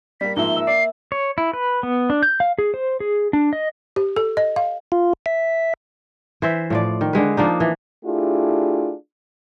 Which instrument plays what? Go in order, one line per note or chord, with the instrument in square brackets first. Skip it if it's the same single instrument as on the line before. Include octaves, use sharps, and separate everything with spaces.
[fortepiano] G3 A#3 [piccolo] B6
[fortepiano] G#2 F3 [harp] A#3 E5 [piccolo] G7
[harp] E5 E6
[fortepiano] D5 [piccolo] C7
[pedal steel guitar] C#5
E4
B4
B3
D4
G6
F5
G#4
C5
G#4
D4
D#5
[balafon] G4
A4
D#5
F5
[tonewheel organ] F4
E5
[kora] E3 C5 E5
A2 F3 D5
D#3
D3 G#3 B4
F3 A#3 D4 D#4
E3
[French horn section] A3 D4 E4 F4 G4 G#4